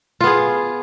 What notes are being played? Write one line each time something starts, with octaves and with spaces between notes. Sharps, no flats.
B3 F4 G#4